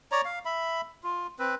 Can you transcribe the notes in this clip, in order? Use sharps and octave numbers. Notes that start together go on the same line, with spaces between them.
C#5 D5 A#5
F5
E5 B5
F4
C4 B4